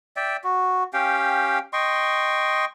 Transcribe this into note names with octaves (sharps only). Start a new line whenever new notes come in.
D5 E5 G5
F#4
C#4 G4 F5 G5
D#5 G5 C6 C#6